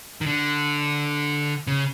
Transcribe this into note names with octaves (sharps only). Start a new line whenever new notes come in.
D#3
D3
C#3